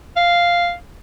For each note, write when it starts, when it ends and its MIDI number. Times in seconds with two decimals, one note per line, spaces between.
0.16 0.74 77